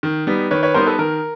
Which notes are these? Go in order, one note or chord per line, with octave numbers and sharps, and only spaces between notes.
D#3
G3 B3 D#4
D#3 B4 C#5
B4 C#5
G3 B3 D#4 A#4 C5
A4 B4
D#3 A#4